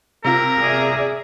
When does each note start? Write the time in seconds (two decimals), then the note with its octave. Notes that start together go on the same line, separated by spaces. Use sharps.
0.24 C3 F4 A#4 A#5
0.59 G#4 D5 E5